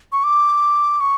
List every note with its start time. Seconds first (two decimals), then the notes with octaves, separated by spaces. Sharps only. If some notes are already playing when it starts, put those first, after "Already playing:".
0.12 C#6
0.24 D6
1.01 C#6